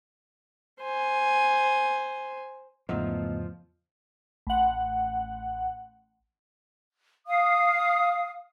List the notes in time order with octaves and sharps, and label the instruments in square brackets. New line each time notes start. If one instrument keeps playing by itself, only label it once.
[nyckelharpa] C5 G#5
[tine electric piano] E2 G#2 C#3 [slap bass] F3 [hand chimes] A3 B3 D#5
[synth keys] A1 F#5
[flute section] F5 D#6